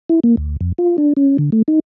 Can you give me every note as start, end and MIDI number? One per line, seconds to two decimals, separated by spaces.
0.10 0.20 64
0.24 0.35 58
0.37 0.56 38
0.61 0.72 41
0.78 0.97 65
0.98 1.13 62
1.17 1.37 61
1.38 1.50 50
1.52 1.62 57
1.68 1.80 63